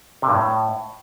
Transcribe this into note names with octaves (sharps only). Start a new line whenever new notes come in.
C3
G2
A2